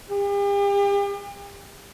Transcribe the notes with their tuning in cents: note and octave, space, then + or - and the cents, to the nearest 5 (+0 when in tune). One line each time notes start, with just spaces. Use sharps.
G4 +40